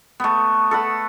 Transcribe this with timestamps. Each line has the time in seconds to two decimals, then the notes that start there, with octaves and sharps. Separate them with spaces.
0.20 A3 B3
0.71 A4 B4 F#5